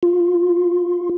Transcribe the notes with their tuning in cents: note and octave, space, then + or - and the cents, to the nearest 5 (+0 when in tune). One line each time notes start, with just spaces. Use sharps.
F4 +10